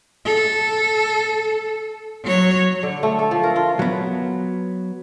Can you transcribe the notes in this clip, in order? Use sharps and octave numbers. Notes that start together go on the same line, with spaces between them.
A4
F#3 C#5
D3
A3
A4
F3
A#4
F4
F#3 B3